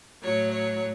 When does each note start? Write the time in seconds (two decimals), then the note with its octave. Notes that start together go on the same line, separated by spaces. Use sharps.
0.22 A2 F#3 C#5
0.52 C#5